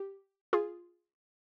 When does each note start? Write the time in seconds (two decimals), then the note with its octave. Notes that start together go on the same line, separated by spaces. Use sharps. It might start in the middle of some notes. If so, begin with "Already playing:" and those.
Already playing: G4
0.53 F4 G#4